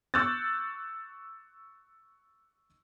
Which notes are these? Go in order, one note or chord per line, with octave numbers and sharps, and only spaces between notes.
C#6 D6 E6 F#6 G6 A6